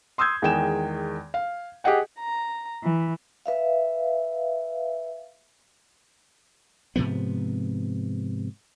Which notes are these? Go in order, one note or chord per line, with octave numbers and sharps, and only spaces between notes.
C6 D#6 E6 G6 G#6
E2 D#3 G#3 G5 G#5 E7
F5
G4 G#4 D#5 F#5 G5
A#5
E3
B4 E5 F5
G#2 C3 F3 B3